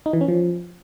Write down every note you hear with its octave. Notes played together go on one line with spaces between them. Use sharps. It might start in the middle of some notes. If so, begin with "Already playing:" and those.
D#4
E3
C#4
F3